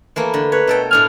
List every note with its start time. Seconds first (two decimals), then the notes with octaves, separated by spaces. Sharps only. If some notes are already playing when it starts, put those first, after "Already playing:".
0.16 E3 A3 A#3
0.34 D3
0.52 B4 C#5
0.67 B2 A4 G5
0.91 A2 D4 G#5 F6